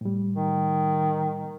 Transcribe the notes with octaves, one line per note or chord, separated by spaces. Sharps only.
A2 G3
D#3